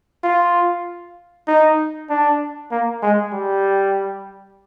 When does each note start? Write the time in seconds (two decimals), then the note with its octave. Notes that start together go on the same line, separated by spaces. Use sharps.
0.23 F4
1.47 D#4
2.09 D4
2.71 A#3
3.02 G#3
3.33 G3